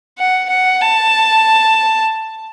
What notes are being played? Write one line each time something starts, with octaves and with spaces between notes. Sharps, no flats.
F#5
F#5
A5